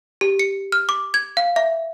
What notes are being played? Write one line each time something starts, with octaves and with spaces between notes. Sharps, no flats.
G4
C#7
F6
D6
G#6
F5
E5